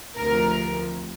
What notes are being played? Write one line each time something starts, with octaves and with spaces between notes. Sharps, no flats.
D2 C3 F3 A#4